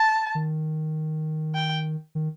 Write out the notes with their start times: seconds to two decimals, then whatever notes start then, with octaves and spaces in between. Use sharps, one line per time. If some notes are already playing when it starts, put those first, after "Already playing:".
Already playing: A5
0.35 D#3
1.54 G5
2.15 D#3